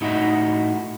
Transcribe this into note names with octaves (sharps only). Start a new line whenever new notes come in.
A2 D#4 F#4 G4 D#5 E5